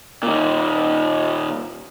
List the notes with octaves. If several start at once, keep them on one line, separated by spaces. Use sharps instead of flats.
A#2 D#3